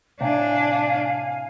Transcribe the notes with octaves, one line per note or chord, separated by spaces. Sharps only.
A2 C3 D4 F5 G#5